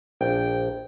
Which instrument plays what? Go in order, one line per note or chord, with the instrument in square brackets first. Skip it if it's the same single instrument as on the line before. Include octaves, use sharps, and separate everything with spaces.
[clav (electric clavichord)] A#1 [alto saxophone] G5